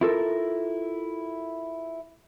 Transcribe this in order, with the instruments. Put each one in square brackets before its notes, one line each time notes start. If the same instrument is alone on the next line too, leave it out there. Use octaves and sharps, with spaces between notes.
[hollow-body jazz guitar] E4 F4 A4 A#4